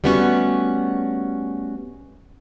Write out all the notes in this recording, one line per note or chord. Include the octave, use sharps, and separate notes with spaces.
G3 A3 B3 C#4 D#4 F#4